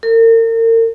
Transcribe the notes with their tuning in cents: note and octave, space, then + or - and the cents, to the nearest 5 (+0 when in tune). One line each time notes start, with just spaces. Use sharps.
A#4 -40